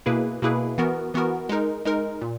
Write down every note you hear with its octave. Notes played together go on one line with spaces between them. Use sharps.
B2 A#3 E4 G#4 B4
B2 A#3 E4 G#4 B4
E3 B3 F#4 A#4
E3 B3 F#4 A#4
G#3 D#4 A#4
G#3 D#4 A#4
A#2